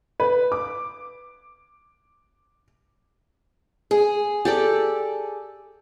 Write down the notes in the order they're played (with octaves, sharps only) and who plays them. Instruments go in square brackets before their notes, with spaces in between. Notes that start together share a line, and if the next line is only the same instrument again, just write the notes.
[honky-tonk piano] B4
D6
[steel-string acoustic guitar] G#4
[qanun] G4 A4 D5